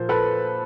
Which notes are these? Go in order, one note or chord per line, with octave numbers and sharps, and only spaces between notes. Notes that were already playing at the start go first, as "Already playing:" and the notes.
Already playing: A#2 F3 C5
A4 B4